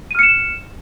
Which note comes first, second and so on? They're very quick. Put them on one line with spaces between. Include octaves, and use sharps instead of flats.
D#7 F6 C#7 E7